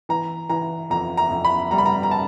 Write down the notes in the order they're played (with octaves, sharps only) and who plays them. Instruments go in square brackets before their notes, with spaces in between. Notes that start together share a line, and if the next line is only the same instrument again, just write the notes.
[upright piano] E3 A#5
E3 A#5
F2 A#5
A#5
F2
B5
G3 A#5
B5
A#5
A#5
A5